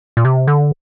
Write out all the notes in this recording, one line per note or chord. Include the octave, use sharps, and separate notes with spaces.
A#2
C3
D3